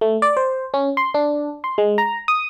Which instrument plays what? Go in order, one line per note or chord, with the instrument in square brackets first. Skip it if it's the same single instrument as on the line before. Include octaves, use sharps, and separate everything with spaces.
[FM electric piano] A3
D5
C5
C#4
C6
D4
C6
G#3
A#5
D#6